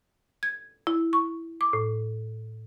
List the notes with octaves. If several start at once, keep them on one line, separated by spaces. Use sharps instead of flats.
G#6
E4
C#6
D6
A2